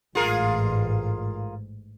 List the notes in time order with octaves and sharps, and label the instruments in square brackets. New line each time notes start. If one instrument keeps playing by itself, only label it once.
[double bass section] A1 G#2 [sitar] F4 G#4 A#4